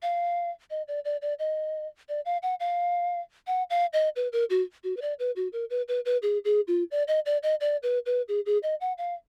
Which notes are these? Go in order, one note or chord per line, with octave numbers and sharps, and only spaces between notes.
F5
D#5
D5
D5
D5
D#5
D5
F5
F#5
F5
F#5
F5
D#5
B4
A#4
F#4
F#4
B4
D5
B4
F#4
A#4
B4
B4
B4
G#4
G#4
F4
D5
D#5
D5
D#5
D5
B4
B4
G#4
G#4
D#5
F#5
F5